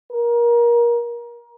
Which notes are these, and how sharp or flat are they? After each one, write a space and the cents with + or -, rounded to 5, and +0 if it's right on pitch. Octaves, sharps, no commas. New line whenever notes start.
A#4 +25